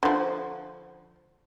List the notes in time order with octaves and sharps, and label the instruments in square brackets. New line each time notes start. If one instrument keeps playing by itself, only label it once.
[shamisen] D3 F3